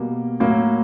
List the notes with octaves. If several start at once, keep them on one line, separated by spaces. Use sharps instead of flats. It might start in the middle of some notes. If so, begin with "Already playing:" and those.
Already playing: B2 G3 A#3
A2 F#3 A#3